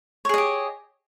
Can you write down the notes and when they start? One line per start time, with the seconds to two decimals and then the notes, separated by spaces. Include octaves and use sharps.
0.25 C#5
0.29 G#4
0.34 D#5
0.38 G4